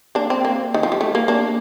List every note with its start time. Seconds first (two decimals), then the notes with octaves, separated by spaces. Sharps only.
0.15 A#3 D4
0.30 C4
0.45 A#3
0.74 D#3
0.83 F3
0.92 G3
1.01 A3
1.15 A#3
1.28 A#3 D4